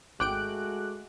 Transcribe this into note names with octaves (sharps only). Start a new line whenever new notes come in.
G#1 G#3 A3 F#4 G5 D6 F#6 D7